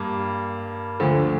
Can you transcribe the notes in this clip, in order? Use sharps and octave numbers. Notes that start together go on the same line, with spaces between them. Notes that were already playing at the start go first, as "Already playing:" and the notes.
Already playing: G2 A#3
D2 D3 F3